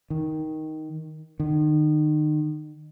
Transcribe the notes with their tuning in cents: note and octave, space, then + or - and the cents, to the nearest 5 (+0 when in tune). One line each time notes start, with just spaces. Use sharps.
D#3 +10
D#3 -35